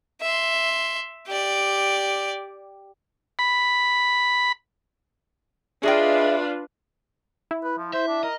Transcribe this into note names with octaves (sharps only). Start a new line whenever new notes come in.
E5 C6
G4 D5
B5
D4 F4 G#4 B4 D#5 E5 G5
E4
B4
F3
C5 E5
D4
A#4 D#5